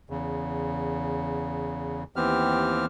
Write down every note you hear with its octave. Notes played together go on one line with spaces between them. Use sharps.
E2 C#3
D#2 E3 B3 C4 G4 F6